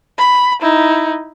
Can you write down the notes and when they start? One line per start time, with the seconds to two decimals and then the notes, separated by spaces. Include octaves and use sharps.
0.18 B5
0.62 D#4 E4